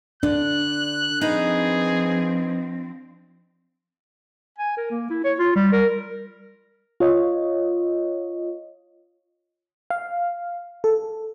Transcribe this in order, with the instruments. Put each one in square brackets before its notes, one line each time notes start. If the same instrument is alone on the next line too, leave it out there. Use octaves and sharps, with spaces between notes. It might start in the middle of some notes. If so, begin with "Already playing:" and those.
[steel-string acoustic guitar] D3 [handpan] D4 [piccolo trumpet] F#6
[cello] F3 C4 [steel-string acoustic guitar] D#4 B4 [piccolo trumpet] G#4
[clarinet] G#5
A#4
A#3
E4
C#5
F4
G3
A#4
[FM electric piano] F4 C#5 D#5
F5
A4